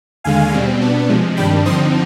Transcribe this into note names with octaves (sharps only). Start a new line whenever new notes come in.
D#2 D3 G#3 F5 G#5
B2 G3 C4
B2 B3 D4
C3 F3 G#3
G2 D#3 G3 D4 G5 B5
D3 F3 C4 D#4 C6 D#6